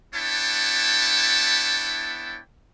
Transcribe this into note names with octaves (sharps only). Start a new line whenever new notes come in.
B3 D4 E4 C#5 G5 A5